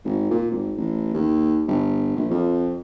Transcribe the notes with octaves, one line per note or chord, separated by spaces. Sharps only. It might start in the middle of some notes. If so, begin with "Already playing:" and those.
G#1
A#2
G#1
A1
D#2
G1
A#1
F2